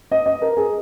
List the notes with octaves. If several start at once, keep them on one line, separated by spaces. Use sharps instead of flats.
D#5
D#5
A#4
G#4